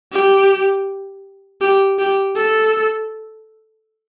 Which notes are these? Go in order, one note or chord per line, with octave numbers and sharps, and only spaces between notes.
G4
G4
G4
A4